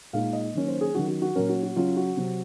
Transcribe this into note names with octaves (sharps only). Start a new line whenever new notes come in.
A#2 G#3 D#4 F5
D#5
D#3 F#3 A#3 C#4
C5
G#4
D#3 F#3 C#4 F#4
F#4
F#4
A#2 F#3 C#4 A#4
F#4
F#4
C#3 F#3 C#4 F4
F#4
C3 F#3 C4